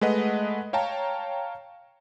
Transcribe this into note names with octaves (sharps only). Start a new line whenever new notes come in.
G#3 A3 B4 D#5 F#5
C#5 F5 G5 A5 A#5